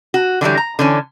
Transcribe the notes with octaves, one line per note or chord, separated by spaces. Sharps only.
F#4
D3 E3 F#3 G3
A#5
D3 E3 C#4